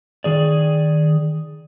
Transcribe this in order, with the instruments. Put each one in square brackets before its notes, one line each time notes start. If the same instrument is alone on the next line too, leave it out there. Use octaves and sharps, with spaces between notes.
[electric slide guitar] D#3 G#4 D5